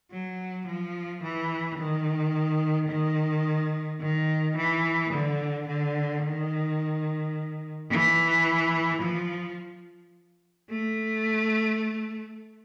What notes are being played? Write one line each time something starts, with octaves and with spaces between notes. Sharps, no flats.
F#3
F3
E3
D#3
D#3
D#3
E3
D3
D3
D#3
E3
F3
A3